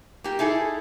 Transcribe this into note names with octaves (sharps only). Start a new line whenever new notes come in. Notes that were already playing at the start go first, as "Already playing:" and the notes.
A#3 G4
D#4 E4 G#4 A4